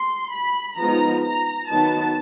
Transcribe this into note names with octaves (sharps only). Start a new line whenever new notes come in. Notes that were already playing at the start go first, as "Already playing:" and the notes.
Already playing: C6
B5
F3 G#3 B3 D#4 A#5
A#5
D#3 F#3 B3 D#4 A5